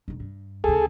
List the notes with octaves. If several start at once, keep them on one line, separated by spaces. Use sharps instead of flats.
E1 D#3
G2
D2 C#3 G#4 A4